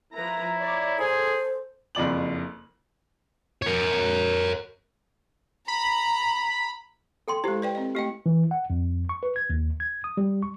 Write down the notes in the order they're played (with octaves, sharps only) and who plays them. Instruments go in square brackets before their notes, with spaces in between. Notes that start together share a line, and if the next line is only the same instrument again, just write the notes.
[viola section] F3 B4 A#5 [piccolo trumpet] E4
[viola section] C#5 D5 A#5
[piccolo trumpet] G#4 [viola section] A4 [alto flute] C5
[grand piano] F#1 F2 D5 F#7
[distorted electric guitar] A#4 C#5
[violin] A#5 [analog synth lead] B5
[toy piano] A4 G5 C6
[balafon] G#3 C5 [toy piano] E4 G4
[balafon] B4 D5 G5
C4 D#5
[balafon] A3 D#5 [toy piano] G4 G5
[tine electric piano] E3
F#5
F2
C#6
B4
G#6
D#2
G#6
D#6
G3
C#6